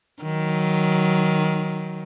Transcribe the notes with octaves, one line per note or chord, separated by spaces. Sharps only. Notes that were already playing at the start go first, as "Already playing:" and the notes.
D#3 F#3